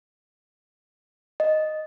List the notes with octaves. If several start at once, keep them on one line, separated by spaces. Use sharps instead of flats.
D#5